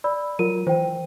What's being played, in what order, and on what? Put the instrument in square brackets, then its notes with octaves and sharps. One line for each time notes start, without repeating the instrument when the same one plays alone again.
[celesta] D5 B5 E6
[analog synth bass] F#3 [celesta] F4 A#4 D#7
[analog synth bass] E3 [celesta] C5 G5